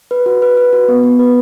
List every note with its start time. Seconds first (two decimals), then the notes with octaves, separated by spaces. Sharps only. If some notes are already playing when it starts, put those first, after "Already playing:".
0.11 B4
0.26 F#4
0.42 B4
0.57 B4
0.73 F#4
0.88 B3
1.04 B3
1.19 B4